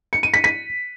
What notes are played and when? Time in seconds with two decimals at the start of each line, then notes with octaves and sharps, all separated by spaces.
0.13 C#7
0.23 D#7
0.34 B6
0.44 B6